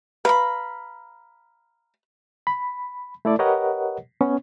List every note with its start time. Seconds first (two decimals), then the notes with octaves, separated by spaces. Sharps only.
0.25 B4 F5 A#5 B5
2.47 B5
3.25 A3 E4 A4 D5
3.39 G4 A#4 B4 C#5 D#5 F#5
4.21 B3 C#4